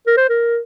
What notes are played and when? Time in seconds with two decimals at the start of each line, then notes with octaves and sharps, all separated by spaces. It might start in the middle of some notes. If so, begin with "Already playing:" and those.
0.07 A#4
0.17 C5
0.29 A#4